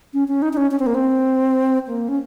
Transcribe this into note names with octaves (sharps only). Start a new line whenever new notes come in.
C#4
C#4
D#4
D#4
C#4
C#4
C4
A#3
C4
A#3
C#4